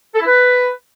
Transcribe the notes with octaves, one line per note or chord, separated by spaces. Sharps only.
A4
E4
B4